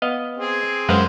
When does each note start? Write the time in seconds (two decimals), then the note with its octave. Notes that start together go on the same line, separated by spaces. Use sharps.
0.02 B3 D#5 F5
0.37 C4 G#4
0.89 F#2 G#3 B4 C5 F5 F#5